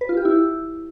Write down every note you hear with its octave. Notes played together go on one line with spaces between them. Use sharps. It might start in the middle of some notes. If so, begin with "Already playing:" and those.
B4
F4
G4
E4